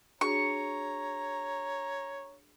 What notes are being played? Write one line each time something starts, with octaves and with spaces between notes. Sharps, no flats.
D4 F#4 G#4 C#5 A#5 C#6